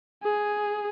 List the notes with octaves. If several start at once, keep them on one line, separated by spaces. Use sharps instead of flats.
G#4